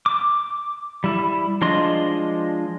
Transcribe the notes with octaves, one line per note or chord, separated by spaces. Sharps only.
D6
G3 E4
F3 G#3 D4 D#5 C6